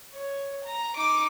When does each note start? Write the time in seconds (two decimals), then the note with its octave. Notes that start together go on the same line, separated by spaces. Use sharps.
0.13 C#5
0.65 A#5
0.96 D#4 D6